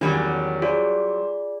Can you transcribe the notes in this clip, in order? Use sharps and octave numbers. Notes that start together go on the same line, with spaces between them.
E2 D#3 F#3 G3 C#4
F4 G#4 C5 D5